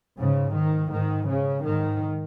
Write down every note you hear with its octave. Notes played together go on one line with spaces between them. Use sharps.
G#2 C#3
D#3
G#2 D#3
C#3
G#2 D#3